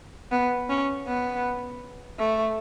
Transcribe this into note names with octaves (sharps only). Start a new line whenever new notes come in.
B3
C#4
B3
A3